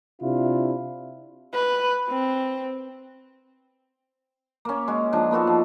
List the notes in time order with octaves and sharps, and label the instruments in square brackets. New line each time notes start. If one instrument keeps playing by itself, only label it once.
[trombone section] C3 D4 E4 F4
[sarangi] B4
C4
[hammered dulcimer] A#3 C#4
G#3 C#4 F#4
F3 G#3 D4 D#4
A#3 B3 F#4 A4
F3